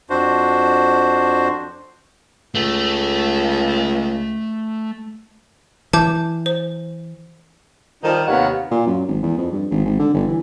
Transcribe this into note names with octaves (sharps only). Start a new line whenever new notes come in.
F2 D4 F#4 C5
C#2 A3
E3 A5 D6 G6
C5
D#3 F3 G3 D#4
D#2 C3 B3 C#5 F5 F#5
A#2
F#2
G#1
E2
F2
G2
G#1
G#1
D3
G1
E3